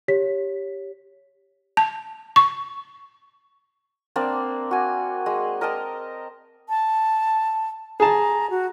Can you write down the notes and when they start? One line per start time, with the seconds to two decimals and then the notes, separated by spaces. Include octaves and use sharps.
0.08 G4 C#5 B6
1.77 A5
2.36 C#6
4.16 A#3 C4 D4 D5
4.71 F#4 G#5
5.26 G#3
5.61 A#4 D#5 G5 A5
6.69 A5
8.00 G#4 A5 A#5
8.50 F#4